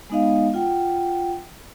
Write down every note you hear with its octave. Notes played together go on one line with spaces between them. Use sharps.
G#3 B3 D#4 D#5 F5
F4 F#5 G5